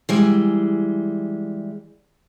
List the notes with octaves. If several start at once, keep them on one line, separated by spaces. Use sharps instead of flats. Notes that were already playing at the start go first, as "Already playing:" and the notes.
E3 G3 G#3